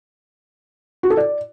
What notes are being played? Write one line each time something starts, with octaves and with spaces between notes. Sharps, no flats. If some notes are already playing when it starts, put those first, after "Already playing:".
F#4
A4
D5